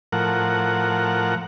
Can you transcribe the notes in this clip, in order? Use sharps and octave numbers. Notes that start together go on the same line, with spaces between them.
A2 F3 A#4 F#5